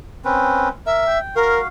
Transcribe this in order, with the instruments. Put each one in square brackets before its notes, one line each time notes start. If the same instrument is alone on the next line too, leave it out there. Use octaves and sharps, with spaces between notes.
[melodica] C4 C#4 B4
[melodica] A#4 [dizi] E5
[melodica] G5
[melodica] F#4 F5 [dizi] A#4